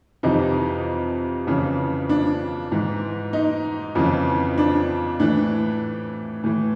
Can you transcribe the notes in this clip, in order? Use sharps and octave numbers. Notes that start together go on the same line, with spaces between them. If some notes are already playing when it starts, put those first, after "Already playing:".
F2 C3 E3 D#4
F2 C#3 E3
D4
G#2 E3
D#4
F2 C#3 E3
D4
A2 E3 D4
A2 E3